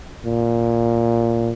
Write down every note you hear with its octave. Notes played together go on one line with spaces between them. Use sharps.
A#2